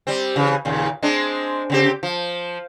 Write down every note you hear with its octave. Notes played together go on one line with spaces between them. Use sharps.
G3 C4
C#3 E3
D#2 A#2 C#3
G#3 C4 D4
C#3 C4 G4
F3